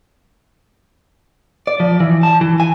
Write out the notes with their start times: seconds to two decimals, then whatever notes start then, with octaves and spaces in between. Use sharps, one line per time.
1.67 D5
1.80 F3
2.00 E3
2.23 A5
2.41 E3
2.60 G#5